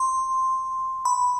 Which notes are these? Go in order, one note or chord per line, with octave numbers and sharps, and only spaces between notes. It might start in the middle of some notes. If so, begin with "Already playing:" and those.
Already playing: C6
B5